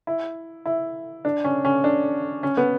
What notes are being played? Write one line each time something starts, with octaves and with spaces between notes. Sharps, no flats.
E4
E4
D4
C#4
C#4
D4
C#4
B3